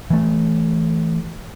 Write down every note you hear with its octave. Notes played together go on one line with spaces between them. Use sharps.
E3 A3